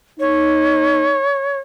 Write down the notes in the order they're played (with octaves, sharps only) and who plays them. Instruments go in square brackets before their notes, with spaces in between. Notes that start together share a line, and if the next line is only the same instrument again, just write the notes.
[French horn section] D#4 [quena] C#5